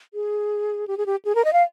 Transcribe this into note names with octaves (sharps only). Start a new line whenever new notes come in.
G#4
G4
G#4
G4
G#4
A#4
D#5
F5